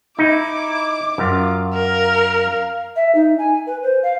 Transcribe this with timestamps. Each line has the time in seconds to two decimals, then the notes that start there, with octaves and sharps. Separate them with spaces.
0.19 D#4 E4 D6
1.18 F#2 F4
1.74 A#4 F5
2.96 E5
3.15 D#4
3.38 G#5
3.67 B4
3.83 C5
4.03 F5